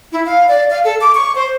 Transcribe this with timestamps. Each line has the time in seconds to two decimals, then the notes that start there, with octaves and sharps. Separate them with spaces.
0.12 E4
0.26 F5
0.48 D5
0.70 F5
0.84 A4
1.01 D6
1.15 C#6
1.35 C5